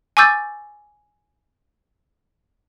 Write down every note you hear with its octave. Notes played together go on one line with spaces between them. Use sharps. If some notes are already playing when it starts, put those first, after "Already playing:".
G#5 C#6 D6 E6 G6 A6